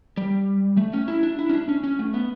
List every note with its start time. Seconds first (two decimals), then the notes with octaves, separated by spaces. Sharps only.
0.17 G3
0.77 A3
0.93 C#4
1.08 E4
1.23 D4
1.39 E4
1.49 C#4
1.53 D4
1.69 C#4
1.84 C#4
1.99 A3
2.14 B3